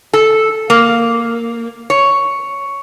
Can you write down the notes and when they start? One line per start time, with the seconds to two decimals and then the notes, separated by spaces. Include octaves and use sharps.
0.13 A4
0.70 A#3
1.90 C#5